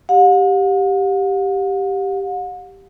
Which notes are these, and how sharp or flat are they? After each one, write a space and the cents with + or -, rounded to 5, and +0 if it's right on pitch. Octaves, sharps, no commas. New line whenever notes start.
G4 +0 F#5 -45